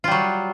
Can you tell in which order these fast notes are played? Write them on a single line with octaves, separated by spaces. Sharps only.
F4 G3 F#3